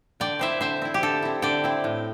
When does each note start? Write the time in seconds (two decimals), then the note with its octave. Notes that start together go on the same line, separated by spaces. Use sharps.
0.20 D3 D5 G5
0.39 C4 E4 C5 E5
0.61 D3 C5 E5
0.82 C4 E4
0.94 G4
1.02 D3 A4
1.23 C4 E4
1.42 D3 D5 G5
1.64 C4 E4
1.84 A2